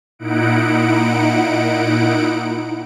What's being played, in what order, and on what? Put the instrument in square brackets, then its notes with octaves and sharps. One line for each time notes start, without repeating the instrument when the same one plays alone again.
[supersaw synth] A#2 D#4 E4 F#5 D7